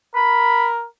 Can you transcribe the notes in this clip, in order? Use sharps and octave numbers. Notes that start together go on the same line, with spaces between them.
A#4 B5